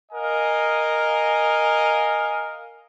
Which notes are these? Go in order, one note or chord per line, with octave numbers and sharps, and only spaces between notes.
A#4 D#5 F5 G#5